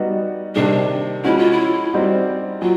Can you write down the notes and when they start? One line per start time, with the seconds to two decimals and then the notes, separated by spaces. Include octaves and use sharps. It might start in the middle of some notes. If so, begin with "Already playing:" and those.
Already playing: G3 B3 D#4 F#4
0.55 C3 D#3 G3 D4
1.24 F3 G#3 C#4 E4 F#4
1.37 F4
1.51 E4
1.93 G3 C4 D#4 F#4
2.62 F#3 F4